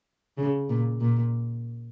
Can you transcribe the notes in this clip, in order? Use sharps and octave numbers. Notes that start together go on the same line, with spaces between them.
C#3
A#2
A#2